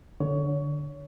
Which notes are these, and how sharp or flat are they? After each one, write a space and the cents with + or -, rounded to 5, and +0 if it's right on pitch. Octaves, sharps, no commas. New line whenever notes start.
D3 +0 C#5 +20